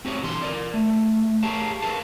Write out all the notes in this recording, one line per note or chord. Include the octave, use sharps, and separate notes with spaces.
C4 F#4 G4 C#5
D3 E3 C6
A#4 D5
A3
G4 G#4 A#4 C#5 F5 A5
A#4 B4 F5 A5